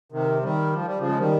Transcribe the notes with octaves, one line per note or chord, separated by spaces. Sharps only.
C3 D#3
D#3 G3
F3
G3
C#3 F3
G#3
D#3 G3